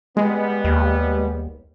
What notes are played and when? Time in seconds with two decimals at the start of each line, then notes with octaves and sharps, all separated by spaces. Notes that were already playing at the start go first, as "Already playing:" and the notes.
0.17 G3 G#3 B3
0.64 D#2